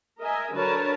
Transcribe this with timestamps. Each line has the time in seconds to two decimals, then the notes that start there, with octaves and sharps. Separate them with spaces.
0.19 A#4 D#5 E5 G#5
0.53 D3 F#3 A#4 B4 C#5 A5